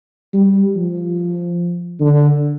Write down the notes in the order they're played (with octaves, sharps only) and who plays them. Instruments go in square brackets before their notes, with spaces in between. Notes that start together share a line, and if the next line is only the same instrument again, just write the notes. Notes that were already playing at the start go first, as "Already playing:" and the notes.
[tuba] G3
F3
D3